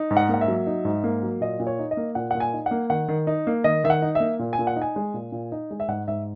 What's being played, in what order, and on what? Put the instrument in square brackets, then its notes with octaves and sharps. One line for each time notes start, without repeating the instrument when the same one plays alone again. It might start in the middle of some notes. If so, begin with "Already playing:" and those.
Already playing: [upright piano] D#4
G#2
F#5
A#3 F#5
E5
F#3
D#4
G#2
A#3
F#3
A#2 D#5
A#2
C#5
D#4
D#5
A#3
A#2 F#5
A#2 F#5
G#5
D#4
F#5
A#3
D#3 F#5
D#3
D#4
A#3
D#3 D#5
D#3 E5
F#5
D#4
E5
A#3
A#2
G#5
A#2
F#5
D#4
G#5
G#3
A#2
A#2
D#4
G#3
E5
G#2 F#5
G#2 E5